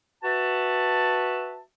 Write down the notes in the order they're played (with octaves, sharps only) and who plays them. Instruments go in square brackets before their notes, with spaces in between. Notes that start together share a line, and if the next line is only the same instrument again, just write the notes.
[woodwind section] F#4 B4 E5 A5